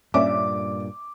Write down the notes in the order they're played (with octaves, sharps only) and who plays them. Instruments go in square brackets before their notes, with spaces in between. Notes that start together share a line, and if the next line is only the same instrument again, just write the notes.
[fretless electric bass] G2 A#2 [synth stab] A#3 C#4 E5 [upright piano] D5 [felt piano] D6